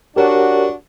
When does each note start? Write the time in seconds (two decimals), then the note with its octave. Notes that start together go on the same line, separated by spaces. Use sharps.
0.16 D4 F#4 G4 A#4 C#5